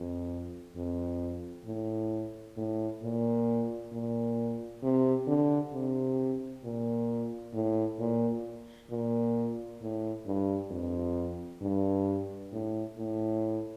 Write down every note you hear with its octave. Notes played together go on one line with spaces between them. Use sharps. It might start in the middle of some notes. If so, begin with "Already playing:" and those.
Already playing: F2
F2
A2
A2
A#2
A#2
C3
D3
C3
A#2
A2
A#2
A#2
A2
G2
F2
G2
A2
A2